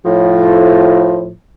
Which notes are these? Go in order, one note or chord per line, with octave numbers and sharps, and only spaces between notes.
A2 F3